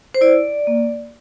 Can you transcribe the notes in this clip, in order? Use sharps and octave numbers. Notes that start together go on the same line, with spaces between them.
C5
E4 D5
A#3